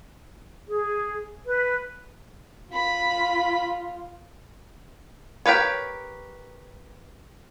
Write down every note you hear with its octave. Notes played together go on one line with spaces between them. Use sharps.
G#4
B4
F4 B5
G4 A#4 B4 C#5